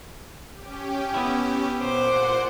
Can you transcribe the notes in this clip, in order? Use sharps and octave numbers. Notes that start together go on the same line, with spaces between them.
C#4 G4
B3 E4
A#2 C5 F#5 D6